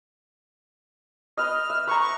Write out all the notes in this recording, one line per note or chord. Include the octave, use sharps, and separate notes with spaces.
B4 D#5 F6
E5
B4 A#5 C#6
C#6